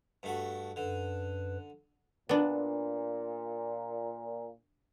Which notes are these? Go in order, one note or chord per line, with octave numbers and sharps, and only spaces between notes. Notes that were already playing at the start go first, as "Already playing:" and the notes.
G2 A3 F#4
F#2 D3 B4
A#2 B3 D4